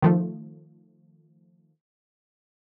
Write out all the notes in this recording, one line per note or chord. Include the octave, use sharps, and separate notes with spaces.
D#3 F3 A3